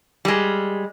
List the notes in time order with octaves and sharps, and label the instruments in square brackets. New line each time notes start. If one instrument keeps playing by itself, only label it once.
[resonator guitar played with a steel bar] G3 G#3